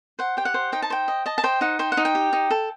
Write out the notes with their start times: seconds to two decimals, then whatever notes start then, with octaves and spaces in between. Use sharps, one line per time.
0.19 C5 F#5
0.37 G4 G5
0.45 F#5
0.54 C5
0.72 D#4 G5
0.82 A5
0.90 C5 G5
1.08 D#5
1.26 D#5 A5
1.38 A5
1.44 C5 G5
1.61 D#4 F#5
1.79 C5 G5
1.92 F#5
1.97 D#4
2.05 G5
2.15 G4
2.33 D#4
2.51 A4